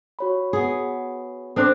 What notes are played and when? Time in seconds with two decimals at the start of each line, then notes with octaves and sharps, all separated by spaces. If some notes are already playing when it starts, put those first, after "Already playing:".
0.19 F#4 C#5 B5
0.53 B3 G#4
1.56 C4 D4 A4 C5 G5 D6